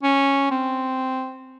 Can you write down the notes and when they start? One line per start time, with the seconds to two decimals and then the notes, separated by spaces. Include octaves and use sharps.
0.03 C#4
0.51 C4